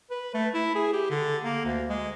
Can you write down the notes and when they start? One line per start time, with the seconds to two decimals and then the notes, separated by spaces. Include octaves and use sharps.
0.11 B4
0.34 A3
0.54 E4
0.75 G#4
0.93 G4
1.10 D3
1.44 A#3
1.65 D2
1.89 G#3